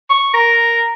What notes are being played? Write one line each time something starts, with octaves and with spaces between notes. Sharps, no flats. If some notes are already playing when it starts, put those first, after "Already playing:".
C#6
A#4